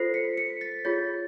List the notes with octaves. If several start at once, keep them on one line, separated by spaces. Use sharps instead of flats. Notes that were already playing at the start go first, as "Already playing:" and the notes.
Already playing: F4 A4 C5 A#6 C7
B6 C#7
B6 C#7
A6 B6
F4 G#4 C#5 G6 A6